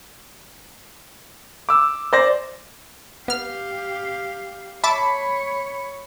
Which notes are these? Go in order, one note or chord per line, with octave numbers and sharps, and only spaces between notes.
D6 E6
C5 D5 A#6
B3 G4 F5 F6
C#5 E5 A5 B5 D6